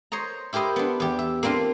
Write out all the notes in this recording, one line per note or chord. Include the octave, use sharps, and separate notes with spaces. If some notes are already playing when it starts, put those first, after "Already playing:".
C5 C#5 D#5 A#5
E4 G4 A#4 C5 D#5
B3 D4
E2 G4
E5
A#3 C4 D4 F4 F5